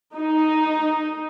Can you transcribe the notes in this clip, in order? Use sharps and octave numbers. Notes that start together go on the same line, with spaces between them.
D#4